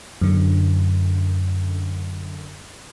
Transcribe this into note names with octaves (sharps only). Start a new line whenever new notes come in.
F#2 D3